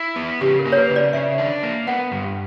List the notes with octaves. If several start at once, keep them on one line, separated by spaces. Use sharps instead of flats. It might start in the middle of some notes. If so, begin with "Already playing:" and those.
Already playing: E4
B3
C#3 G4
A#4
A#3
C#5
B4
C#3
D5
C#3 E5
D4
A#3
B3 F#5
G2